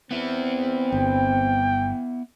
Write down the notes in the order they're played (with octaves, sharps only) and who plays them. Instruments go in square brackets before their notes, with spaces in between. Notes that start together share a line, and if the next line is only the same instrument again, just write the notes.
[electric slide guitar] B3 E4 [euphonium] C4
[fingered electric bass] G1 [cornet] G5